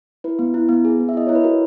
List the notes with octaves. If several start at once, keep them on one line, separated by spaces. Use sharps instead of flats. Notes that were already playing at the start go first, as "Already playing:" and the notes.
E4 B4
B3
E4
B3
G#4
B3
E5
E4 D#5
E4 C#5
B4
F#4 A#4